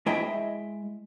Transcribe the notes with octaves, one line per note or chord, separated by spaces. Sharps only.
G#3 E4 D#5 E5 G5